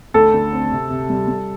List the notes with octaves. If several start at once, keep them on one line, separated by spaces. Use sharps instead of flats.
D2 A4
D3
C4
C3
C3
G3
G3